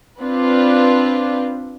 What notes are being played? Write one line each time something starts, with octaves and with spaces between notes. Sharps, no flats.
C4 D4 F4 B4